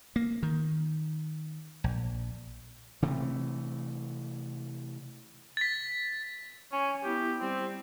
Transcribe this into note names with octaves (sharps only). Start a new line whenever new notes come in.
A#3
D#3
A#1
C3 E3 A3
A6 B6
C#4 G#5
B3 E4 G4
G3 C4